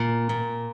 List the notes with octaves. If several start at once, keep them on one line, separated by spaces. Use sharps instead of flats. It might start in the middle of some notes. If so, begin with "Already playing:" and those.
Already playing: A#2
A#2